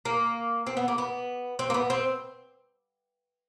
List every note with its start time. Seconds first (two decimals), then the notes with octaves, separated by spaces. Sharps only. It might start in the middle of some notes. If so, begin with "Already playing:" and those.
0.05 A#3
0.67 C4
0.77 B3
0.88 A#3
0.98 B3
1.59 C4
1.70 A#3
1.74 B3
1.90 C4